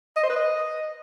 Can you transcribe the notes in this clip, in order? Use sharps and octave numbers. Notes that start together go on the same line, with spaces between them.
D#5
C5
B4
D#5